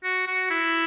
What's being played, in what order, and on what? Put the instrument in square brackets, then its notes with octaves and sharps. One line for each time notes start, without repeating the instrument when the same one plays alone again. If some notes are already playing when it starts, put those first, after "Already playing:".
[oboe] F#4
F#4
E4